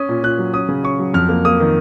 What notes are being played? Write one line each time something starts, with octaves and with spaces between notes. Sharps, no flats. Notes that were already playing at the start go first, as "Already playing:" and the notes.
Already playing: C#4 D#6
A#2
A#2 F#6
F#3
C#4 D#6
C#3
C#4 C#6
F#3
F2 F6
A#3
A#3 D#6
D#3